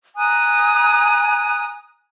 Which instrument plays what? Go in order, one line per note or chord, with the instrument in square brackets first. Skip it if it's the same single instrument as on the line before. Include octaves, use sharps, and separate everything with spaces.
[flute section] G#5 A#5 D#6 F#6